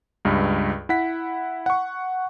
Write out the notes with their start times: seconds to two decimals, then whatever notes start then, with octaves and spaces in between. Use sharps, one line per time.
0.25 C#2 G2
0.89 E4 F#5 B6
1.66 F#5 C#6